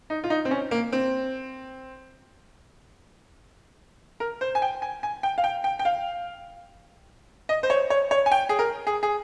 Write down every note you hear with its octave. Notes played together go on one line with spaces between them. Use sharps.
D#4
F4
D#4
C4
C#4
A#3
C4
A#4
C5
G#5
G5
G#5
G#5
G5
F5
G5
G5
G5
F5
D#5
C5
C#5
C#5
C#5
G#5
G5
G#4
A#4
G#4
G#4